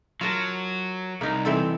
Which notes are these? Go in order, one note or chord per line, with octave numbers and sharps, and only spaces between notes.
F#3 F4 A#4 A5
C2 A#3 D#4
E3 C4 A4